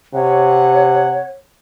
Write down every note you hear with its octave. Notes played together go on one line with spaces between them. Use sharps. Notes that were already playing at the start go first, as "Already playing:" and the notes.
C3 C#5 F#5